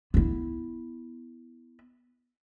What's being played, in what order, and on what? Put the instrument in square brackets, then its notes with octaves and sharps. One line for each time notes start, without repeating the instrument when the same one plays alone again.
[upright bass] B3 E4